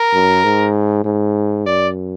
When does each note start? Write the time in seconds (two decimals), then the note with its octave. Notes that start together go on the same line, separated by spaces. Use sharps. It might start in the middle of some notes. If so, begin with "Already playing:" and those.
Already playing: A#4
0.13 F#2
0.44 G#2
1.04 G#2
1.66 F#2 D5